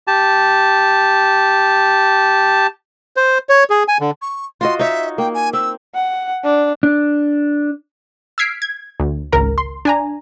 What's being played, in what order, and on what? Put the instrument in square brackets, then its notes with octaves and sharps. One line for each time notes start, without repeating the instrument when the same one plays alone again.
[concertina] G4 A5
[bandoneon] C5
C#5
G#4
G#5
D3
[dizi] C#6
[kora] F4 F#4 D#5 [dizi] C6
[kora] D#4 C#5 [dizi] E5
[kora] A#3 [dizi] G5
[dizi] G#5
[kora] C4 [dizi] E6
[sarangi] F#5
D4
[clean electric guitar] D4
[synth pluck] E6 F6 G#6 B6 C7 D7
G#6
D2
G#1 C#2 A#4 A#5
C6
D4 G#5 A#5